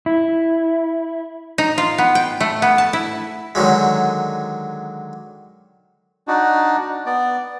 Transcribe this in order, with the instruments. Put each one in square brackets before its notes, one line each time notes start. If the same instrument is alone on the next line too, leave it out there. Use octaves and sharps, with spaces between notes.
[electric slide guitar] E4
[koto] D#4
F4
B3
G5
A3
B3
A5
E4
[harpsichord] D3 D#3 F#3 G#3
[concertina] D4 D#4 F#4
B3 D5